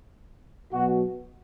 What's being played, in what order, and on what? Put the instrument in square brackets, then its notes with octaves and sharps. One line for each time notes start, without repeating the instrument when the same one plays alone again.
[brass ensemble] B2 F#3 F#4